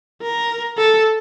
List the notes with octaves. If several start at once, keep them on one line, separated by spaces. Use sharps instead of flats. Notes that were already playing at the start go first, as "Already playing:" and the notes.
A#4
A4